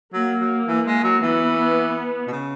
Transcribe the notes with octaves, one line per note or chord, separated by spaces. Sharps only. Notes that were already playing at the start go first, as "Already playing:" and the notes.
F#3 A#3
F#3
E3
G#3
F#3
E3 B3
B2
C#3